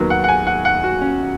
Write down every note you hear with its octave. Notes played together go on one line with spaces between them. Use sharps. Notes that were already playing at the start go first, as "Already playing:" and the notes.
Already playing: D#2 D#3 F#3 B3
F#5
F#5
G#5
F#5
F#5
F#4
C#4